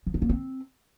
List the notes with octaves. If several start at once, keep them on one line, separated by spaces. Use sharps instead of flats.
F3
D4
A#3
C4